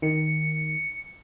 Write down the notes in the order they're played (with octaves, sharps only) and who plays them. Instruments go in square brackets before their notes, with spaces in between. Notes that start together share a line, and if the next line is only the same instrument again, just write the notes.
[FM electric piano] D#3 [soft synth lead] C#7